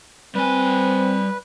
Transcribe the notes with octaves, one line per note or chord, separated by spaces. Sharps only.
G3 C4 B4 G#5